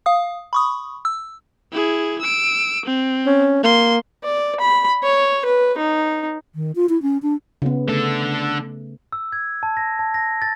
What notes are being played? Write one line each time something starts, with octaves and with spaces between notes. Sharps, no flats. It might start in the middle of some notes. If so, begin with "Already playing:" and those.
F5 D#6
B5 C#6 D#6
E6
E4 G#4
E6 D7
C4
C#4
A#3 C6
D5
B5
C#5
B4
D#4
D#3
F4
E4
C#4
D4
C#3 B3
D3 A3 A4
E6
G#6
A5
A#6
A5
A#6
A6